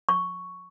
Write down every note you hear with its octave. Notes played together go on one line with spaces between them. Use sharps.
C#6